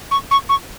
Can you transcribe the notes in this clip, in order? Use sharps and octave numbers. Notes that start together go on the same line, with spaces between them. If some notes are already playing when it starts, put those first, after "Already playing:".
C#6
C#6
C#6